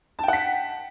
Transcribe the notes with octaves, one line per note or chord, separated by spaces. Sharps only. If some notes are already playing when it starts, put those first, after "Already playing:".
F#5 G5 A5 B6